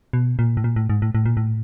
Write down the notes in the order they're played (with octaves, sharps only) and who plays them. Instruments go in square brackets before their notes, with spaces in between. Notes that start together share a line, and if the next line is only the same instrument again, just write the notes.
[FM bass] B2
A#2
A2
A#2
A2
G#2
A2
A2
A#2
A2